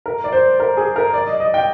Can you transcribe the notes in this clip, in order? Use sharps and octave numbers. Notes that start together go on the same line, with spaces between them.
A#4
D5
C5
A#4
G#4
A#4
D5
D#5
D#5
G5